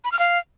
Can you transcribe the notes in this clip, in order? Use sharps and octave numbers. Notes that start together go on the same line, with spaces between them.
B5
F6
F5